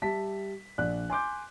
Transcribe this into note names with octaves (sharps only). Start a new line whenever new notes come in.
G3 E5 A5 B6
A#1 D5 F#6
G#5 C6 D6 G6